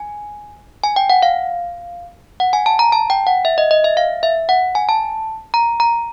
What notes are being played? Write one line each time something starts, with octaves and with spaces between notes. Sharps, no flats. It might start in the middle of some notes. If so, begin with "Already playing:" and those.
Already playing: G#5
G#5
G5
F#5
F5
F#5
G#5
A5
A#5
A5
G5
F#5
E5
D#5
D#5
E5
F5
E5
F#5
G#5
A5
A#5
A#5